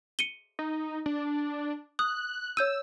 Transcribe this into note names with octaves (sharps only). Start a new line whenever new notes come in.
C#7 D#7 G7
D#4
D4
D#6 F#6
C#5 E6 G6 D#7